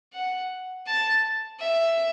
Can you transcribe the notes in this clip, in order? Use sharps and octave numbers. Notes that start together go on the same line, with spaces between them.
F#5
A5
E5